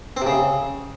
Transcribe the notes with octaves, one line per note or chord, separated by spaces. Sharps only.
C4
C3
C#3